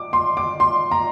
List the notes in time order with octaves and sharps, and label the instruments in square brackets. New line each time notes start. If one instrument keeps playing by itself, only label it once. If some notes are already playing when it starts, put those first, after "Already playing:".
Already playing: [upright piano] D6
C6
D6
C6
A#5